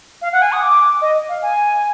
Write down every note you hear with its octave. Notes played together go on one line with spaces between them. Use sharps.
F5
F#5
G#5
D#6
D6
D#5
F5
G#5